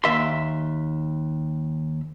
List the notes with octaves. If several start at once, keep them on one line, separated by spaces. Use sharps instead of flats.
D#2 E5 C6